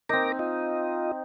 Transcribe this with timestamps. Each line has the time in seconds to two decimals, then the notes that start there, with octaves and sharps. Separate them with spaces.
0.09 C4 D#4 A#4 D6 A#6
0.39 F4 D#5